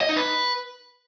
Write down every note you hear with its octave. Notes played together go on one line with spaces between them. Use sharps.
D#5
D#4
B4